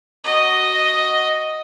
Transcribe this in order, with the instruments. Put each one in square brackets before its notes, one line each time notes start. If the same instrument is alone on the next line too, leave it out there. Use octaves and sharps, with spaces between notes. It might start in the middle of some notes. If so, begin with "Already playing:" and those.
[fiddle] F#4 D#5